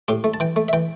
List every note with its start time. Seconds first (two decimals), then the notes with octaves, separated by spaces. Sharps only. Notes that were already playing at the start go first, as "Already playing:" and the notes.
0.08 A2 G4
0.24 A3
0.34 A5
0.40 E3 G5
0.56 A3
0.68 E5
0.73 E3 G5